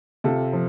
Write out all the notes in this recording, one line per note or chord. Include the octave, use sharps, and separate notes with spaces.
C3 F4 A4
F3